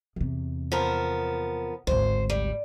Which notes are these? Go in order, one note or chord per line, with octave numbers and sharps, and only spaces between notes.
E2 C3
F3 B3 A#4
G#1 D2 C5
G3